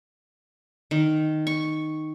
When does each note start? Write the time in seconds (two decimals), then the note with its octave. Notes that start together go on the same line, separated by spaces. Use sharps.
0.91 D#3
1.47 C#6